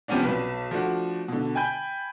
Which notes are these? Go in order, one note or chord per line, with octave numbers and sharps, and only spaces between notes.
C3 F3 G3 B3 C#4 D4
B1 B4
F3 A3 D4 F#4
B2 D3
G5 G#5 B5 G6